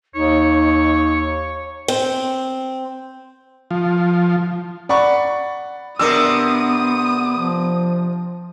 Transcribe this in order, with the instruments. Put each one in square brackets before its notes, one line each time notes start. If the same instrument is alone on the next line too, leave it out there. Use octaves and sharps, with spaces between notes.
[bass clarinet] D#2 [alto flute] D#4 [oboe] C#5
[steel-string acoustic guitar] C4
[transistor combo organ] F3
[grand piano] D5 F#5 B5 C#6
[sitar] C3 D4 [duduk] B3 [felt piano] A#4 E6 [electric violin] D#6
[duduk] F3